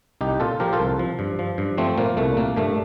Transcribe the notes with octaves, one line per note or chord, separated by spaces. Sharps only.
C2 D#4 G4
A#2 F4 A4
F3 G4 A#4
F4 A4
C2
F3
G2
F3
G2
F3 A3 C4
A#2 A#3
C2 A3
A#2 A#3
G2 A3